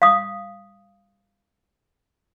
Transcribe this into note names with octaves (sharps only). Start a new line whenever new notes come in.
F5 D#6